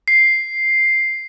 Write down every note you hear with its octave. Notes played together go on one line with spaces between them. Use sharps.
C7